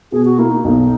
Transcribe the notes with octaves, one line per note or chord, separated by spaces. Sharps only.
B2 G#4
F#4
A#3 E4
D#4
B1 D#4